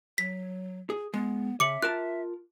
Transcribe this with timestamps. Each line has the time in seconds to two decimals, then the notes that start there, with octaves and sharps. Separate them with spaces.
0.18 F#3 B6
0.90 G#4
1.14 G#3 B3
1.60 C#3 E5 D6 C#7 F#7
1.82 F4 A#4 A5 F#6